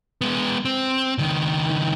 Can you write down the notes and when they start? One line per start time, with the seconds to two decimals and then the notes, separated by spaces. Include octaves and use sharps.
0.21 G#3 B3
0.65 C4
1.18 C#2 D#3